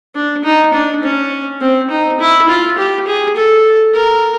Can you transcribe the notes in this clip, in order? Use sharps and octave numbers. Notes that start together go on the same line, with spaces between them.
D4
D#4
D4
C#4
C4
D#4
E4
F4
G4
G#4
A4
A#4